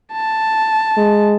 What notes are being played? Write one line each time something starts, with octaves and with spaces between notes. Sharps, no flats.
A5
G#3